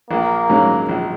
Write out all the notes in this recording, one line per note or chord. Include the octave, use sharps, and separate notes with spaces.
A#1 A#3
G#2 F#3 C#4
A#1